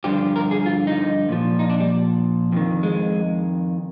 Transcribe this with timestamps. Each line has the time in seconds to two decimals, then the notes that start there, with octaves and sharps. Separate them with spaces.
0.04 G2 D3 F3 G4
0.36 A#4
0.51 G#4
0.66 F4
0.87 D#4
1.29 A#2 F3
1.59 D#4
1.70 D4
1.80 G3
2.52 F2 D#3
2.83 G#3